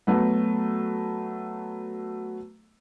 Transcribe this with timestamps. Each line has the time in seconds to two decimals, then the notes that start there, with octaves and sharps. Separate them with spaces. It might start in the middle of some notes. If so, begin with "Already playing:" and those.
0.07 F#3 A3 B3